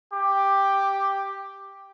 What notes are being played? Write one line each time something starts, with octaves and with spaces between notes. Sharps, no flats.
G4 D6